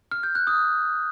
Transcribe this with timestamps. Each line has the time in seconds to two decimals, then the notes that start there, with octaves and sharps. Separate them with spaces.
0.11 F6
0.23 G6
0.35 F#6
0.47 D#6